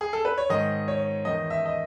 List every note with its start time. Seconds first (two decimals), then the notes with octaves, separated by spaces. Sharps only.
0.01 G#4
0.13 A4
0.25 B4
0.38 C#5
0.49 G#2 D#3 D#5
0.88 C#5
1.25 E2 D#3 D#5
1.50 E5
1.66 D#5